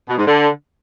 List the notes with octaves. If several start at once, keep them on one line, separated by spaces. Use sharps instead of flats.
B2
G#2
D3